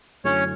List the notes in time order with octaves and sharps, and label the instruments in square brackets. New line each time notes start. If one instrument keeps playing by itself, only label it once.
[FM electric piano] F#2 D3 F#3 A3 E4 [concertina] C#4 C#5